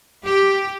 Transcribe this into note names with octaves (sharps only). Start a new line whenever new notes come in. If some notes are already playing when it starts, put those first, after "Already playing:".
G4